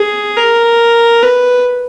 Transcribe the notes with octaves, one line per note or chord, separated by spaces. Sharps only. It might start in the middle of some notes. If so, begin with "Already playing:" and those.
Already playing: G#4
A#4
B4